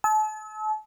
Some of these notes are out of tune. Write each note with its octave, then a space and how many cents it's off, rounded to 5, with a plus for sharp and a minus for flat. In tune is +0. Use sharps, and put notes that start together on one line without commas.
A5 -40 E6 -40